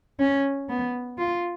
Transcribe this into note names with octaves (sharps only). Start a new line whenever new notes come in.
C#4
B3
F4